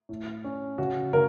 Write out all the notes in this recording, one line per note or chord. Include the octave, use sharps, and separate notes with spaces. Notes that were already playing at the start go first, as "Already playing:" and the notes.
A2
C#4
C#3 F#4
C#3 A#4